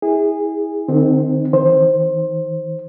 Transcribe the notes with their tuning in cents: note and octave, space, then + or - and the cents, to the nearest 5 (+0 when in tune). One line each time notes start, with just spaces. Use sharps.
E4 -30 G#4 -20
D#3 -45 C4 +0 D#4 +0
D#3 +30 C5 +15